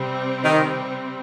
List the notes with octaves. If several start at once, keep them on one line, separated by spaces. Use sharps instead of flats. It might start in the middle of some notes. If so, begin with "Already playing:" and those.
Already playing: C3 G3 C4
D#3